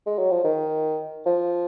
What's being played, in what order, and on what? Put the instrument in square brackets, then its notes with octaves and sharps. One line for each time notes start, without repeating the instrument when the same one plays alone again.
[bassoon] G#3
F#3
F3
D#3
F3